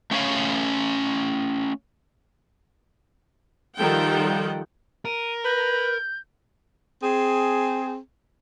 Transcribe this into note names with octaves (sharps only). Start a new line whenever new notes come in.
A3 C#4 C#5 F5
D#3 F3 G3 A4 F#5 G5
A#4 D#7
B4 G6
C4 G#4